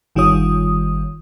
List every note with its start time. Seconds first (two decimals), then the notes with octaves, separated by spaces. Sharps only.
0.16 G1 D#3 G3 F4 C#5 D#6